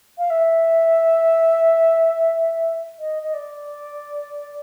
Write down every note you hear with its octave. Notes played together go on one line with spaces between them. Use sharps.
F5
E5
D#5
D#5
D5